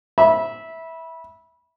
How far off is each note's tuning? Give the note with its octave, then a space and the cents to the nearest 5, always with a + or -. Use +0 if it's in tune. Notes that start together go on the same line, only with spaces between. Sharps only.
E5 -15 B5 -20